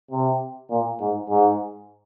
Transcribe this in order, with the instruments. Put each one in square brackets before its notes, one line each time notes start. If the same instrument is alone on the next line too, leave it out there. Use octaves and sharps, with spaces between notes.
[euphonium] C3
A#2
G#2
G#2